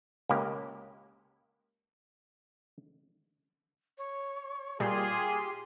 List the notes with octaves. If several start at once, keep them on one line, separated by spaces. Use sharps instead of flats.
C#2 A#3 G4
C#5
A#2 G3 F4 G4 G#4 C6